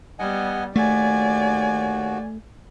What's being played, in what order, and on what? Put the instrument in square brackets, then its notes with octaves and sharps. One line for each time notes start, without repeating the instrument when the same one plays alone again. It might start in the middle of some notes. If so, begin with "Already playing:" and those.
[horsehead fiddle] G3 B3 [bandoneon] D#5 F#5 G#5
[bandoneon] D#2 F#4 [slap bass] A3 [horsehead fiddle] D5 G#5